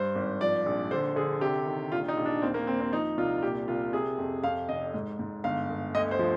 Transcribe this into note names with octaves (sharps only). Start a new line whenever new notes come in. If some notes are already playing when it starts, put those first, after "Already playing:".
Already playing: G2 C5
G#1
F3 D5
A#1
D3 C5
D3 G#4
C3 G4
D#3
A#1 F4
D#4
A#1
D4
D#2 C4
A#3
D#2 C4
C4
F3 D#4
C2 F4
A#2 G4
C2 F4
C3 G#4
F2
F2 F5
F1 D#5
G#2
G#2
G1 F5
G1
D2 D#5
C5
F3